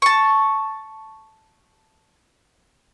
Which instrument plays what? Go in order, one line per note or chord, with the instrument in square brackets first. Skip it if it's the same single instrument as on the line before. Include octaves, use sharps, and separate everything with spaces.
[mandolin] A5 C#6